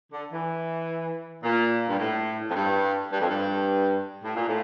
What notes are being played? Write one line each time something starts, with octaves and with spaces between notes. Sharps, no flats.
D3
E3
A#2
G2
A2
F2
G2
G2
F2
G2
A2
A#2
A2